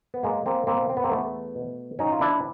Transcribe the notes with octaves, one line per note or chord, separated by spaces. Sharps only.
B3
F#3 G#3 A#3
A#3 C4
B2 A#3 C4
C4
B3
A#3 C4
E2 A3 B3
B2
F#3 C#4 D#4
F4
D4 E4